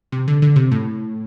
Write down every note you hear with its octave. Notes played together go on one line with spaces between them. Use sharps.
C3
D3
D3
C3
A2